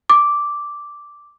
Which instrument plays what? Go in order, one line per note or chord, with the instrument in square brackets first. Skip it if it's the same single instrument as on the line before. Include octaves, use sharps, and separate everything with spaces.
[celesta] D6